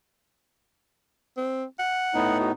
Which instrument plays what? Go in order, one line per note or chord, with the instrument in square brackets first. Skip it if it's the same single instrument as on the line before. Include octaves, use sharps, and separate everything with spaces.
[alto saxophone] C4
F#5
[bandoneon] A2 B3 D#4
[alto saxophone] F#4